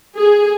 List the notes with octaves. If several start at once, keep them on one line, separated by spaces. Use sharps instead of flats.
G#4